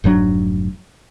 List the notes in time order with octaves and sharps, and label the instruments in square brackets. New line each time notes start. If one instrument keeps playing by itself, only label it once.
[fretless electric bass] F1 G#2 F#3 D4